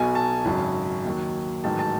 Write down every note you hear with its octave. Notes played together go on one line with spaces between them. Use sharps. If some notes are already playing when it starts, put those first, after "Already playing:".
Already playing: B1 B2 F#3 G#5
A5
G#1 F#2 C#3 F#3
D#2 D#3 F#3
A1 G#2 D#3 F#3 A5
A5